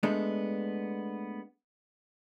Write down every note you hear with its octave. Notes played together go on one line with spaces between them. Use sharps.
G#3 A3 B3 D4